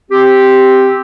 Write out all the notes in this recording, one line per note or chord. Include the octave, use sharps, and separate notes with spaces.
C4 G4